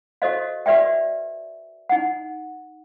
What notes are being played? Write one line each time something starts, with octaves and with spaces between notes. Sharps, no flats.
F#4 A4 C5 D#5 F5
F#4 B4 D5 E5 G5
D#4 F#5